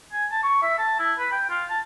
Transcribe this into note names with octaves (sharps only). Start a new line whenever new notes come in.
G#5
A5
C#6
E5
A5
E4
B4
G5
F4
A5